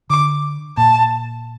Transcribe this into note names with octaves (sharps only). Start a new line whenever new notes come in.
D3 D6
A#2 A5